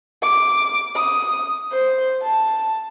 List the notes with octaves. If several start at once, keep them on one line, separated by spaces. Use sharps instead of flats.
D6
D#6
C5
A5